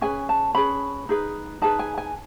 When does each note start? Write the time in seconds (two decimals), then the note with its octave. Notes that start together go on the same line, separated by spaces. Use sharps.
0.01 C#4 G#4 B4 G#5
0.29 A5
0.55 C#4 G#4 B4 B5
1.09 D#4 G#4 B4
1.62 D#4 G#4 B4 A5
1.79 G#5
1.98 G#5